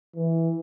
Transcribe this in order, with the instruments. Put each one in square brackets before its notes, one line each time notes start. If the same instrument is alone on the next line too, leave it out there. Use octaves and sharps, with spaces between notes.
[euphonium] E3